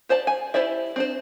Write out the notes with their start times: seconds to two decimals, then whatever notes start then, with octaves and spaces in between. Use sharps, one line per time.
0.09 G4 C5 D5 A5
0.27 G#5
0.54 E4 G4 C5 D5 E5
0.96 C4 D4 C5